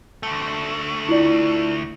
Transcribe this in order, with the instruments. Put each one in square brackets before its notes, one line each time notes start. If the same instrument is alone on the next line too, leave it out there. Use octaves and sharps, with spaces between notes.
[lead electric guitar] D2 A3
[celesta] E4 F4 D5